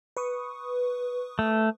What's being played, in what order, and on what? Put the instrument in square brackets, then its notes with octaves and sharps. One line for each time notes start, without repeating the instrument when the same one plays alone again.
[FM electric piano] B4 C#6 D#6
[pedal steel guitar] A3